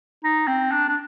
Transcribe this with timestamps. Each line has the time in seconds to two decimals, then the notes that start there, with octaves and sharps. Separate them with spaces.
0.24 D#4
0.47 C4
0.71 D4
0.88 D4